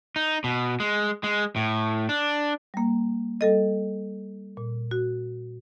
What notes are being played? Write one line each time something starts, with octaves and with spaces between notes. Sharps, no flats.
D#4
B2
G#3
G#3
A2
D4
G3 A#3
G3 A4 D#5
A#2
F#4